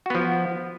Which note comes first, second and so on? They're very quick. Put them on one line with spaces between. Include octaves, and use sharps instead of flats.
F#4 B3 F3